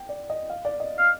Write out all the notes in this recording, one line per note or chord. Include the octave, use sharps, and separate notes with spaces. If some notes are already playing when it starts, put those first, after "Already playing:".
Already playing: G5
D5
D#5
F5
D5
D#5
F5